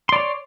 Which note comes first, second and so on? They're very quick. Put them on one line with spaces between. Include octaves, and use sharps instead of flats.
C6 D5 C#5